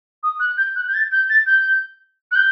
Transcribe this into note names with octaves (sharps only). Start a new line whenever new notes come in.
D#6
F#6
G6
F#6
G6
A6
G6
A6
G6
F#6
G6